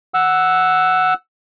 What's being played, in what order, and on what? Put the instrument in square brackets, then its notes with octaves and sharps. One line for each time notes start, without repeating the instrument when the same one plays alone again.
[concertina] F#5 E6